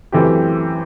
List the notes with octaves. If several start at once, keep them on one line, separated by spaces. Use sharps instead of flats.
F#2 E3 A3 C4 G4